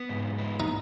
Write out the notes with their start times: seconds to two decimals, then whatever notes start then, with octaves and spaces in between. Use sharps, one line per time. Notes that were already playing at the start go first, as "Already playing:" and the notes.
Already playing: B3
0.09 G#2
0.38 B3
0.60 D#4